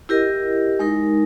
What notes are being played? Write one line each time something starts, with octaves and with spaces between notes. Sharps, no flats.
E4 G4 A#4 D#5
G#3 D#4 A#4